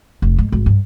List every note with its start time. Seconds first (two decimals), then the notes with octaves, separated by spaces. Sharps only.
0.22 F1
0.38 G#2
0.52 G#1
0.66 G2